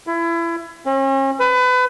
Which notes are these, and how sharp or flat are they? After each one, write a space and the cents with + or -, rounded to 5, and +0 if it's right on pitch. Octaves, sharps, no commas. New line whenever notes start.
E4 +30
C#4 -40
B4 +30